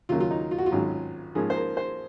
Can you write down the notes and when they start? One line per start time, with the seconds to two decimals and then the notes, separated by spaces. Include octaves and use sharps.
0.09 D#2 C#3 F#3 A#3 F4
0.20 F4
0.31 D#4
0.51 F4
0.58 F#4
0.66 F4
0.72 G#1 G#2 F#3 C#4
1.35 G#2 F3 A#3 C#4 G#4
1.50 C5
1.56 A#4
1.77 C5